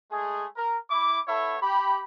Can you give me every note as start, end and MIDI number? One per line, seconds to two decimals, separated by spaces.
0.11 0.45 56
0.11 0.45 57
0.11 0.45 68
0.56 0.77 70
0.90 1.19 64
0.90 1.19 86
1.27 1.56 59
1.27 1.56 64
1.27 1.56 69
1.27 1.56 73
1.27 1.56 76
1.62 2.02 67
1.62 2.02 83